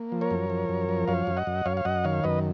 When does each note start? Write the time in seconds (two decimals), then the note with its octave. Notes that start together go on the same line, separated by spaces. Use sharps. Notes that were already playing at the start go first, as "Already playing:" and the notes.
Already playing: A#3
0.12 F3
0.21 A#4 C#5
0.31 F#2
0.50 F3
0.69 F#2
0.89 F3
1.08 F#2 C#5 F5
1.27 F#2
1.37 D#5 F#5
1.47 F#2
1.66 F#2 C#5 F5
1.77 F5
1.85 F#2 D#5 F#5
2.04 D#3 C#5 F5
2.24 F#2 B4 D#5